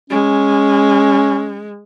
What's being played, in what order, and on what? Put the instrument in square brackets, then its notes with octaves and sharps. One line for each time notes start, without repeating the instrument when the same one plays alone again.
[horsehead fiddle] G#3 [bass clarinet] C#4